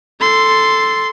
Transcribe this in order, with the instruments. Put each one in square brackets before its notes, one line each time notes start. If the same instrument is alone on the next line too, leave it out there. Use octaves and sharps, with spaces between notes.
[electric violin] A4 C6